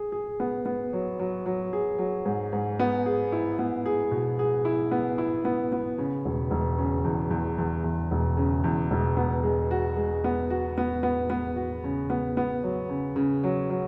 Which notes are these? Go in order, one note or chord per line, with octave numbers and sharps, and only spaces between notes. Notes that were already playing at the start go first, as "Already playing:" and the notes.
Already playing: G#4
G#4
B3
B3
F#3
F#3
F#3
G#4
F#3
G#2
G#2
B3
G#4
E4
B3
G#4
B2
G#4
E4
B3
E4
B3
B3
C#3
E1
E1
C#3
E2
E2
E2
E2
E1
C#3
E2
E1
B3
G#3
F#4
G#3
B3
F#4
B3
B3
B3
F#4
C#3
B3
B3
F#3
C#3
C#3
F#3
F#3